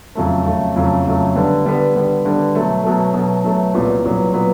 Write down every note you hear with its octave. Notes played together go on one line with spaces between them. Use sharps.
F2 C#3 F#3 A3
F2 C#3 F#3 A3
F2 C#3 F#3 A3
F2 C#3 F#3 A3
D3 G3 B3
D3 G3 B3
D3 G3 B3
D3 G3 B3
B2 F#3 A3
B2 F#3 A3
B2 F#3 A3
B2 F#3 A3
C2 A#2 F#3 B3
C2 A#2 F#3 B3
A#2 F#3 B3